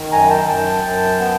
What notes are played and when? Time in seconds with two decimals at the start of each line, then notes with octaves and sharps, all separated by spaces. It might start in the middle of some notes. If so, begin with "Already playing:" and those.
Already playing: D#3
0.11 F#2 G#5 A#5
0.30 G5 A5
0.48 F#2 G5 A5
0.84 F#2
1.20 B3